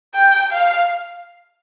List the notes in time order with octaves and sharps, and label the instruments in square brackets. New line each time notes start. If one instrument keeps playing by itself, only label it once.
[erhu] G5
F5